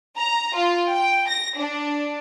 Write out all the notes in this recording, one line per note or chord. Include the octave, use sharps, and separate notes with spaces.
A#5
F4
G5
A#6
D4